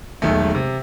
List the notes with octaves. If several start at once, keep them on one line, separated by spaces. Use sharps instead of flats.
E1 B1 D#3 A3
C3